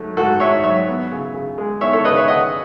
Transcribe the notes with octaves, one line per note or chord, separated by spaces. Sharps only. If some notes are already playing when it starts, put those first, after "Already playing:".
Already playing: G#2 F#3 A3
G#2 F#4 A4
G#2 C#5 E5
F#3 C#5 E5
B3
C#3
C#3
G#3
B3 C#5 E5
A4 C#5
C#3 B4 D#5
C#5 E5
C#3 D#5 F#5